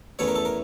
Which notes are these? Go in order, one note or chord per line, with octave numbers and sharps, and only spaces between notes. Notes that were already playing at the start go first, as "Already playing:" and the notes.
E2 E3 A3 C#4 C#5
A#4
A4
A#4